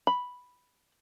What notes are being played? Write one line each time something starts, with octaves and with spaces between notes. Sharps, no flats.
B5